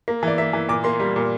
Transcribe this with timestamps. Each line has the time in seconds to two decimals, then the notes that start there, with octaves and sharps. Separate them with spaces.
0.08 A#3
0.23 E3 D5
0.38 A#3 E5
0.53 E3
0.69 A#2 D6
0.84 A#3 C6
1.00 G3
1.16 A#2